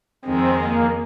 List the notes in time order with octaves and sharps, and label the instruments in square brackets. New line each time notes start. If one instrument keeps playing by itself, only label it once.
[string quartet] F2 D#3 G#3 [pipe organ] C4
[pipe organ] A#3